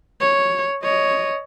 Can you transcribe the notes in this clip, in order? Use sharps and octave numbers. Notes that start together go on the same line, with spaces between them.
C#5
C#5 D#5